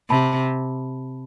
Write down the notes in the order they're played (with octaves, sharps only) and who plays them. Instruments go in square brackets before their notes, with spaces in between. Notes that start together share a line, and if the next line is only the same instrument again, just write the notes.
[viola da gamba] C3 [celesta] A5 B5